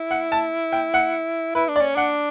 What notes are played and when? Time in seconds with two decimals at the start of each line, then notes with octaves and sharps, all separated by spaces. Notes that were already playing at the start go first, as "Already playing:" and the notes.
Already playing: E4
0.11 F#5
0.32 A5
0.73 G5
0.94 F#5
1.55 E4 B4
1.68 D4
1.76 D5
1.81 C#4
1.95 D4 F#5